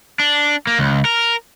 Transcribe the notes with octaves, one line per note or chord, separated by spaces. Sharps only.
D4
A#3
C#2
A#4